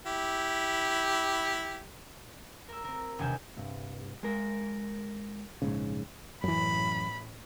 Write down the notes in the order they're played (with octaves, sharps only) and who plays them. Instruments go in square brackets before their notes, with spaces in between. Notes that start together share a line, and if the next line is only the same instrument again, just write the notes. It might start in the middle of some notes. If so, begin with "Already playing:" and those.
[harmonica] E4 G4
[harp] A#4 E6
C4 A#4
E1 D#2 C3 G#5 G6 E7
[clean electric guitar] C2 G2
G#3 A#4
[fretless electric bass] A#1 G#2 C#3
[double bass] A1 [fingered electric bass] F#2 E3 [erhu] B5